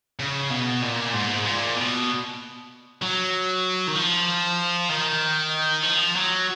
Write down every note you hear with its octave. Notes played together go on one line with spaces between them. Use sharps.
C#3
B2
A#2
G#2
A#2
B2
F#3
D#3
F3
D#3
F3
F#3